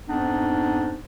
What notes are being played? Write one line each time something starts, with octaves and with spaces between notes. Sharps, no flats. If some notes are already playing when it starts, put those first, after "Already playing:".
F2 G#2 B3 D4 D#4